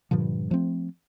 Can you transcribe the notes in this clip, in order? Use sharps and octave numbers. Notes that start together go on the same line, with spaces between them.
G2 A#2 D3 F3
F3 A3 C4